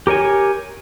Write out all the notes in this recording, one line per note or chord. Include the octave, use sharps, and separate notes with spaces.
G4 A#4 C#5 G#5